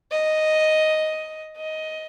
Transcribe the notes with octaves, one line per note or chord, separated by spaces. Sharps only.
D#5
D#5